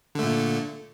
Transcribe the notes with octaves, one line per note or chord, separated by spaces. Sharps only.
A#2 D3 A3